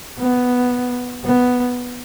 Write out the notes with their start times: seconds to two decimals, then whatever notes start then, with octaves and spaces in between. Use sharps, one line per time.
0.19 B3
1.24 B3